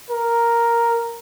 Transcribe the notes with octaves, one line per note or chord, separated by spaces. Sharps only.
A#4